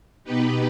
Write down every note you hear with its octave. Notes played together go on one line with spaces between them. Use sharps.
B2 B3 D#4 G4 B4